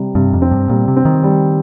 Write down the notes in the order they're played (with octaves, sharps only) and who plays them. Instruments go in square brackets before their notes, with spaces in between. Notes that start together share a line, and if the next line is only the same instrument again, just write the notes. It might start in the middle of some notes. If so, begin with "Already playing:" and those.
Already playing: [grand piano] C3 G3
[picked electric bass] G2 [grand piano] C3
[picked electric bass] F2
[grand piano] C4
[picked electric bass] G2
[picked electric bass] A#2 [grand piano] G3
[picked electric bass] C3
[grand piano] C4
[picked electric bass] D#3
[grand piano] G3